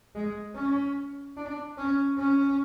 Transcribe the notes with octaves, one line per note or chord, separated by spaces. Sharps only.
G#3
C#4
D4
C#4
C#4